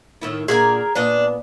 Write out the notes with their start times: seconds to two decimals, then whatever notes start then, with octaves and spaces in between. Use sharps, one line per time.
0.21 A2 D#3 E4
0.48 A#2 D3 G#4 A#4 G#5
0.95 A#2 B3 D4 D#5